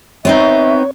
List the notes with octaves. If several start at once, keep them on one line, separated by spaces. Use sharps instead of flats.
B3 C4 D#4 C#5 E5